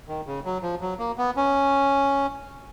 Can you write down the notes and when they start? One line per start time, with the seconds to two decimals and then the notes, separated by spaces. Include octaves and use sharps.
0.08 D#3
0.27 C#3
0.45 F#3
0.62 F3
0.81 F#3
0.99 A#3
1.18 B3
1.37 C#4